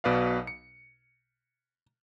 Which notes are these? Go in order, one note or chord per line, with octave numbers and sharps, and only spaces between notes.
B1 B2 B4 D5 F5
C#7